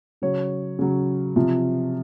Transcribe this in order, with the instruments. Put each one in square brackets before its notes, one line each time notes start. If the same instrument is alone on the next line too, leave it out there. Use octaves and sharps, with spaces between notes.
[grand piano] C#3 F#3 C#5
C#3 F#3
C3 F3